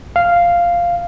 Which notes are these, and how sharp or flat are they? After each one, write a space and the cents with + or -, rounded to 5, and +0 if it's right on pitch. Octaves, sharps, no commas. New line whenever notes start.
F5 -5